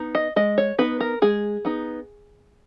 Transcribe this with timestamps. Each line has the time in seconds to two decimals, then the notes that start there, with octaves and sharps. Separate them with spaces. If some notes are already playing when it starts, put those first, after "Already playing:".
Already playing: B3 D#4
0.15 D#5
0.36 G#3 D#5
0.58 C#5
0.78 B3 D#4 B4
1.00 A#4
1.22 G#3 G#4
1.65 B3 D#4